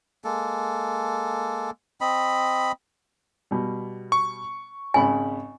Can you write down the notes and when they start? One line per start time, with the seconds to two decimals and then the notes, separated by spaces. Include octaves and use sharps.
0.24 G#3 A#3 A4
2.01 C4 D#5 B5
3.51 B2 G3
4.12 C#6
4.94 G#1 C#3 G#5 B5